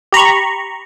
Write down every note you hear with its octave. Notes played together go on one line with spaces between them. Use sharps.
G4 A#5 B5 C#6